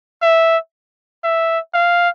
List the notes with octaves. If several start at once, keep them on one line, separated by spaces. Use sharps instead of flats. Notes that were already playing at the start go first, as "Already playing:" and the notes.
E5
E5
F5